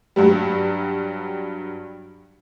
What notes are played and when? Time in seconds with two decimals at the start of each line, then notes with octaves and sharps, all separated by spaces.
0.16 G2 F#3 G3